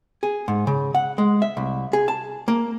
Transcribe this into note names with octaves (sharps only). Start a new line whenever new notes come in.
G#4
G#2
C#3
F#5
G#3
E5
C2
G#4
A5
A#3